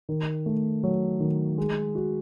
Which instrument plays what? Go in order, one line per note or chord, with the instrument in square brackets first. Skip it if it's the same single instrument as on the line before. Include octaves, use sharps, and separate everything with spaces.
[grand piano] D#3
A3
F#3
D#3
G#3
F#4